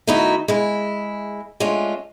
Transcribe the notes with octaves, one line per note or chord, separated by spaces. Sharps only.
D#3 A3 D#4 E4 F#4
G#3 E4
G#3 A3 C#4 D4 F4